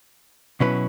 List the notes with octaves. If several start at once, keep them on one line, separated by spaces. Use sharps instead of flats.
B2 F#3 C#4 E4 B4